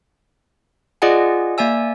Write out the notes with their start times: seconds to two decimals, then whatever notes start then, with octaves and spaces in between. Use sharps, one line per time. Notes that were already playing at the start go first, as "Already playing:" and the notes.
1.02 F4 G#4 D5 D#5 F#5 G#5
1.58 A#3 D5 E5 G#5 E6